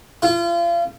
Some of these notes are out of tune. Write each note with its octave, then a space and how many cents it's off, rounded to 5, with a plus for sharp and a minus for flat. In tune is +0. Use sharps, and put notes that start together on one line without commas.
F4 -35